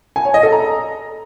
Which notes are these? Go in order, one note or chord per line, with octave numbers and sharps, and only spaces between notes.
G#5
C#5
D#5
A4
A#5